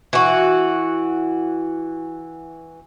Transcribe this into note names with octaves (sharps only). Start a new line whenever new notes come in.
E3 F#4